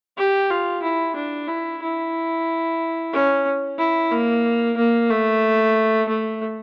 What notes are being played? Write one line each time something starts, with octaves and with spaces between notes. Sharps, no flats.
G4
F4
E4
D4
E4
E4
C#4
E4
A#3
A#3
A3
A3